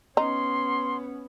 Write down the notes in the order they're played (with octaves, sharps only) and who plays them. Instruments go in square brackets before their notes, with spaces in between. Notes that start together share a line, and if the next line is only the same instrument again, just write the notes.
[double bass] B3 C#4 [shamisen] D#4 [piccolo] C6